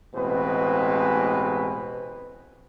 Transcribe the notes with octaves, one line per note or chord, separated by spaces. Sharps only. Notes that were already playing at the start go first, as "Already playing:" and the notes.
A1 B2 G#3 C4 B4